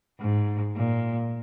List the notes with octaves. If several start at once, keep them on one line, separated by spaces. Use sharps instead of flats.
G#2
A#2